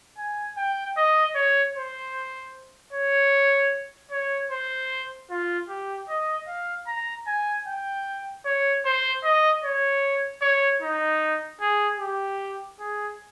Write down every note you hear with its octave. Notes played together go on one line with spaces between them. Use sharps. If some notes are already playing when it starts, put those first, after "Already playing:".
G#5
G5
D#5
C#5
C5
C#5
C#5
C5
F4
G4
D#5
F5
A#5
G#5
G5
C#5
C5
D#5
C#5
C#5
D#4
G#4
G4
G#4